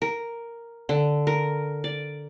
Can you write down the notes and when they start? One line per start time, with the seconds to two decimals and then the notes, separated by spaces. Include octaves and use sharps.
0.02 A#4
0.89 D3
1.27 A#4
1.84 D5